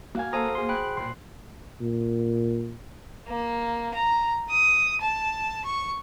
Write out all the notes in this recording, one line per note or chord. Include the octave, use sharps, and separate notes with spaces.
A#3 F#4 F5 G#5
A4 C5 F5 G#5 A#5 D#6
G#4 C6
G5 B5 F#6
A#2 C6 F#6
A#2
A#3
A#5
D#6
A5
C#6